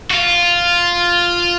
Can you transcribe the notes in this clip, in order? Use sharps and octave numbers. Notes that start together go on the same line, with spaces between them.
F#4
F4